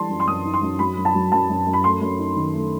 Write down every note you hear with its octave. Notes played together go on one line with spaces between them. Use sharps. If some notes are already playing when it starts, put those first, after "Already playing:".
Already playing: E3 G3 A3 A5 C6
F#2
C6
F#2 D#6
D#4
C6
F#2
F#3 B5
F#2
A5
F#3
F#2 A5
F#2
F#2
B5
A3 C6
F#2
D#4
D#3
A3